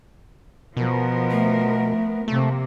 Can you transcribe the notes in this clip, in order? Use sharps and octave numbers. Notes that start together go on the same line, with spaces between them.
B2 F3 B3 A#4
A3
C3 A3 A#3